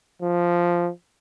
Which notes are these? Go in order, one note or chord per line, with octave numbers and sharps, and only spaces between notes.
F3